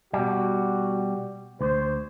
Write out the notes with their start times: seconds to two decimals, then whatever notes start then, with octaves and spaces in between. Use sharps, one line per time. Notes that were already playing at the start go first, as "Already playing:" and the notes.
0.13 B2 G3 F#4
1.61 D2 C5